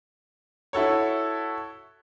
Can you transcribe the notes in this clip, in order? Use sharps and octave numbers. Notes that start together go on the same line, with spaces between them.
E4 F#4 A4 C#5